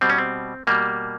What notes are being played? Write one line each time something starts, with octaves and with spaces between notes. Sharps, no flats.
B2 G3 C4
C#4
C4
B2 G3 A#3